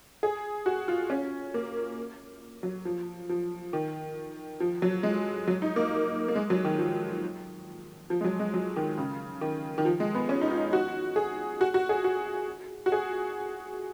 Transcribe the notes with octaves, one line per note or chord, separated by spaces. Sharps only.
G#4
F#4
F4
C#4
A#3
F#3
F3
F3
D#3
F3
F#3
G#3
F#3
D#4
A#3
A#3
G#3
F#3
D#3
F3
F3
G#3
F#3
G#3
F#3
D#3
C#3
D#3
D#3
F3
G#3
B3
C#4
D#4
F4
F#4
G#4
F#4
F#4
G#4
F#4
F#4
G#4